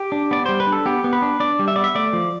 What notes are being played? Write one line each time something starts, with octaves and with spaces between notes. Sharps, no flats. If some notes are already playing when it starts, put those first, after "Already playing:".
Already playing: G4
D4
B3 D5
G3 C5
B4
D4
A4
B3 G4
B3
B4
D4
D4 D5
G3
E5
B3 D5
E5
A3 D5
F3